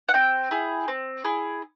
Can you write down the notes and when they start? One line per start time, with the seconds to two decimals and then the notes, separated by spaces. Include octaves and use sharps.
0.09 F#5
0.14 C4 G5
0.51 E4 G#4
0.88 C4
1.25 E4 G#4